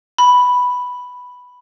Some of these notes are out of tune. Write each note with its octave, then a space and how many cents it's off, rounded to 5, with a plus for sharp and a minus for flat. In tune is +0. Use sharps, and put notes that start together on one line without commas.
B5 +0